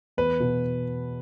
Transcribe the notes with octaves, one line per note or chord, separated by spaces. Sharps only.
E2 B4
B2